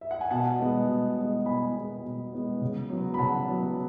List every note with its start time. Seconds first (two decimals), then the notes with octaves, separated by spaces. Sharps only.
0.01 E5
0.11 F#5
0.21 G#5
0.31 B2 F#5 A5
0.60 G#3 B3
0.88 B2
1.17 G#3 B3
1.46 B2 G#5 B5
1.75 G#3 B3
2.03 B2
2.33 G#3 B3
2.61 C#3
2.90 F#3 B3
3.14 B5
3.19 C#3 F#5 A5
3.48 F#3 B3